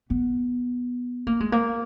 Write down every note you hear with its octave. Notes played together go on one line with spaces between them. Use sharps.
B3
A#3
G#3
A#3